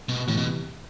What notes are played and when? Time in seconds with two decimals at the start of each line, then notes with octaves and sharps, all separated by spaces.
0.09 B2
0.27 E2 A2 C3 E3 G3
0.37 B2